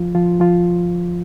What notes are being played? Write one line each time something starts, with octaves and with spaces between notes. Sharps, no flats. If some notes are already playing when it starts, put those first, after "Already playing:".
Already playing: F3 F4
F3 F4
F3 F4